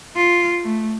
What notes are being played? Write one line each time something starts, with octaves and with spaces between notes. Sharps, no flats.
F4
A3